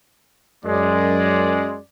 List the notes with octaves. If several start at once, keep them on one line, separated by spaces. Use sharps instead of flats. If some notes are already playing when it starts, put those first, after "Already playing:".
F#2 G#3 D5